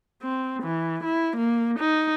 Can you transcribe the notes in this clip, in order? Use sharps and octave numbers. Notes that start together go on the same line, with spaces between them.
C4
E3
E4
A#3
D#4